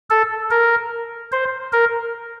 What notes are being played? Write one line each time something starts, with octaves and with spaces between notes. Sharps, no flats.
A4
A#4
C5
A#4